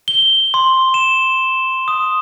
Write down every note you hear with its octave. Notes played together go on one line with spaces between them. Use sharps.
G7
C6
E7
D#6